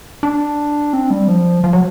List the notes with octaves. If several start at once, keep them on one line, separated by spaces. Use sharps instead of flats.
D4
C4
G3
F3
F3
F#3